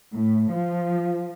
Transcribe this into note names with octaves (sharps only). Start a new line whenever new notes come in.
A2
F3